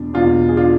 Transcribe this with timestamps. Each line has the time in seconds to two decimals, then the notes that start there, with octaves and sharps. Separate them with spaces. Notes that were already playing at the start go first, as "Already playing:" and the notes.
Already playing: E2 B2 D4
0.14 E2 B2 D4 F4
0.49 G#4
0.57 D4 F4